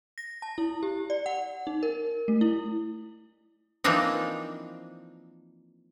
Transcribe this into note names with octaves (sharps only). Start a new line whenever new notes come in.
A#6
A5
E4
G4
D5
F#5
D#4
A#4
A3
E4
E3 F3 A#3 C4 D4 D#4